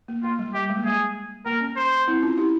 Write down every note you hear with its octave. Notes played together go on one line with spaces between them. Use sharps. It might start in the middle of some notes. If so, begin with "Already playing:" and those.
A#3
A#3 F4
G3
G3 G4
G#3
A#3
G#3 G#4
A#3 A#4
C#4
C5
C4 E4
C#4 F4
E4 G4